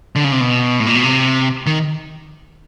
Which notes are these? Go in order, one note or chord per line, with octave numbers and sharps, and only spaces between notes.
D3
C#3
C3
B2
A2
A#2
B2
C3
D#3